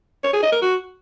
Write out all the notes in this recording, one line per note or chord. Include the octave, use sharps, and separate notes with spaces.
C#5
G#4
D#5
A#4
F#4